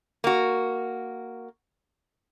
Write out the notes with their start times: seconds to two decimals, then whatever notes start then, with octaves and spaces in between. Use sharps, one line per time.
0.24 A#3 F#4